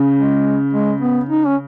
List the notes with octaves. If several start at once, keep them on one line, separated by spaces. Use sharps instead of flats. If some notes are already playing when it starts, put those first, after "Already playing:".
Already playing: C#3
G#3
G#3
B3
D#4
C#4